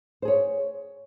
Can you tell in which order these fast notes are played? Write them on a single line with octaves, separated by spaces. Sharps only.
C5 G#4 C#5